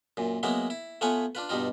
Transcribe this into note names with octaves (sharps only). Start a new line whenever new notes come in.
F#2 A#2
F#3 G#3 A#3 B3 E4
E4
A3 B3 F4 B4 C#5 G#5
D4 F4 B4
G2 B2 G3 D#4 F4